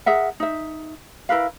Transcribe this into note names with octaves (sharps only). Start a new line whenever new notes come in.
G#4 A#4 E5 F#5
D#4 E5
E4 A#4 B4 F5